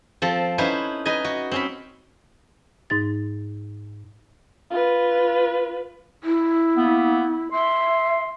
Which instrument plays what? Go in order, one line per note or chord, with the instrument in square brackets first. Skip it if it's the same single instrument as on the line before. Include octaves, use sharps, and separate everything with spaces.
[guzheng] F3 C4 A4
C#4 D#4 E4 B4 C5
D#4 B4 D#5 G#5
F#4
C4 C#4 B5
[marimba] G#2 D#4 A6
[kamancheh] F4 B4
[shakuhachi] E4
[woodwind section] A#3 B3
[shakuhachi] E5 [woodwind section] C6